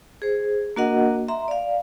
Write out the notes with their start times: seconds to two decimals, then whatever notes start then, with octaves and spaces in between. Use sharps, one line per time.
0.22 G#4 C5
0.76 A#3 D4 F#4 A#4 D#5 F#5
1.28 E5 A#5 C6
1.48 D5 F5